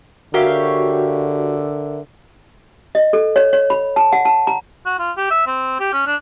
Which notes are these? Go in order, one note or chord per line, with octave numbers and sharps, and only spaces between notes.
D3 F#4 G4 A#4 C#5 E5 F5
D#5
A4
C#5
C#5
B5
A5
F#5
A5
A#5
F#4
F4
G4
E5
C4
G4
C#4
D4